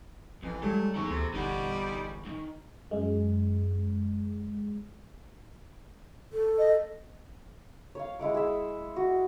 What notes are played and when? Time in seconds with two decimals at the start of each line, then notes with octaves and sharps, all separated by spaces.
0.43 A1 F2 E3
0.62 G#2 F#3 G3 A3
0.96 E2 G#2 A4 B5 C#6
1.10 D2 C3
1.34 G1 G3 D#4 F#5
2.25 D2 D#3
2.91 F#2 G#3
6.32 A4
6.58 D#5
7.95 C#5 F5
8.19 G#3 E4 F#5 D6
8.34 G#4 E5
8.96 F#4